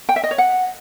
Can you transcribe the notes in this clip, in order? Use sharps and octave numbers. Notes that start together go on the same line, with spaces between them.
G5
E5
D#5
C#5
F#5